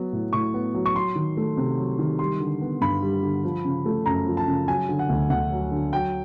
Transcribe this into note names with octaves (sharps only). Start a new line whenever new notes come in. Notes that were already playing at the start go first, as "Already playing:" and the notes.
Already playing: F#3 B3
A2
A2 C#6
B3
F#3
C#6
F#3 C6
D#3
A3
C3
F#3
D#3
G3 C6
D3
B3
G2 B5
G3
D3
F3
C#3
A3
F#2 A#5
F3
A5
C#3
F#3 G#5
D3
F#5
D2
D2 F#5
F#3
D3
F#3 G5